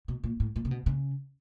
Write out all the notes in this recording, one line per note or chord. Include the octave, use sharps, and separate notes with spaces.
B2
A#2
A2
A#2
C3
B2
C#3